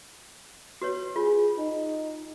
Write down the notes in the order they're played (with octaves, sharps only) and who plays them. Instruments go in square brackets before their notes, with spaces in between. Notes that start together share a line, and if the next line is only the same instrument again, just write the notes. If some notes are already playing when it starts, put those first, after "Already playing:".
[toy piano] F#4 B4 C#5
[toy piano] F4 [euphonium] G#4
[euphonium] D#4